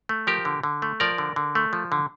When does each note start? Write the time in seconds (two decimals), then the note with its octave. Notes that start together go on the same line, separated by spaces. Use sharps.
0.09 A3
0.27 F3 G4 A#4
0.45 D3
0.63 D3
0.82 A3
1.00 F3 A#4 D5
1.18 D3
1.36 D3
1.55 A3
1.73 F3
1.92 D3